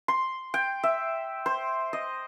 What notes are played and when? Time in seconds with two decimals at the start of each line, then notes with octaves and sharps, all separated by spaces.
0.08 C6
0.54 G5
0.83 E5
1.46 C5
1.93 D#5